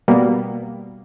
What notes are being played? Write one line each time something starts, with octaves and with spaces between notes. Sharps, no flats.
B2 G3 A#3 B3